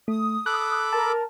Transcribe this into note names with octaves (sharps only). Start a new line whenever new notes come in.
A3 D#6
A4 B5 D6 F#6
A#4 A5